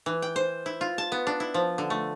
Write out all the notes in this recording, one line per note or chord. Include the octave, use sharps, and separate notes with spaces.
E3
G5
C5
E4
F4
A5
B3
D4
E4
F3
D3
A3